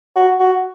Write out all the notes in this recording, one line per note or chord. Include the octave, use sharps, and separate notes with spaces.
F#4
F#4